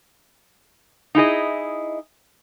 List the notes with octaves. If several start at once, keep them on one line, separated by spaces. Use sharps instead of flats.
D#4 E4 G#4 D#5